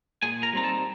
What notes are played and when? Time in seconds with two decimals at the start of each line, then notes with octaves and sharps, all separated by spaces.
0.23 A#2 G#4 G#5
0.43 A#4 A#5
0.53 G3 C4 D#4 A#5
0.63 A4 A5